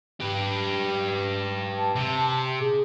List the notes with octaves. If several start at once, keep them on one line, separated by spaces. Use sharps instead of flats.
G4 B4
A5
C3
G#4